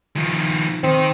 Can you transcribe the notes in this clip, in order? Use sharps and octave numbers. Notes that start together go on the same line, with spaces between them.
D#3 F3
D#3 C4